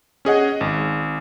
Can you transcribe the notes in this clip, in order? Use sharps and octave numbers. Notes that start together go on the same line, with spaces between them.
C#4 G#4 D#5 F#5
G#1